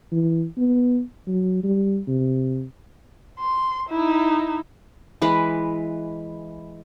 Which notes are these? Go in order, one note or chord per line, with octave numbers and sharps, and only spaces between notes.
E3
B3
F#3
G3
C3
C6
D#4 E4
E3 G#3 B4